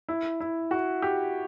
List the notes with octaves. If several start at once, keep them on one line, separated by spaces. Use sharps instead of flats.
E4
E4
F#4
G4